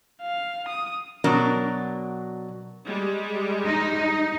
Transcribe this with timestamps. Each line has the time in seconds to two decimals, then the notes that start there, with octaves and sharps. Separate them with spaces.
0.22 F5
0.69 D#6
1.24 B2 F#3 D4 A#4
2.86 G3 G#3
3.65 D#4